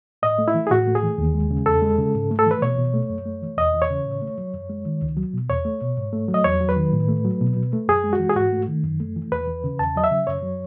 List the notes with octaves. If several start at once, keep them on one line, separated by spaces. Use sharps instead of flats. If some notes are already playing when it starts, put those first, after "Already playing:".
A2 D#5
A3
E4
E3
G#4
A2 F#4
A3
G#4
E3
D#2
G#3
C#3
E2 A4
G#3
C#3
G#2
A3
A4
E3 B4
B2 C#5
B2
A3
F#2
A3
E3
E2 D#5
E3
C#5
C#3
A2
A3
F#3
F#2
G#3
D#3
C#2
F#3
B2
E2 C#5
A3
B2
G#2
A3
F#3
D#5
E2 C#5
F#3
B4
D#3
A2
A3
F#3
B2
B2
A3
F#2 G#4
G#3
F#4
E3
G#4
G#2 F#4
A3
D#3
F#2
A3
E3
E2 B4
E3
C#3
E2 A5
F#3 D#5
E5
C#3
F#2 C#5
F#3